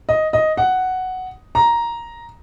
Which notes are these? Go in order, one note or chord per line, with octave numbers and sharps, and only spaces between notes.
D#5
D#5
F#5
A#5